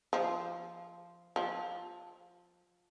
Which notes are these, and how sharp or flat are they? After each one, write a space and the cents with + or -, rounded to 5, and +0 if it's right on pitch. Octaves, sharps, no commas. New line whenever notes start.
F3 -10
F3 +15